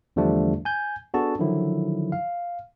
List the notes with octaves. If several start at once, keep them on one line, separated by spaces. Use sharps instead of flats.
E2 D3 F3 G3 A3 D4
G#5 G6
B3 D4 F#4 G#4 A4 A5
D3 D#3 F3 F#3 E4
F5